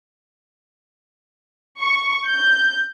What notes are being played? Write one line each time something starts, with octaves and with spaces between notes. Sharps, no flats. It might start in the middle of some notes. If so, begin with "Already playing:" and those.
C#6
G6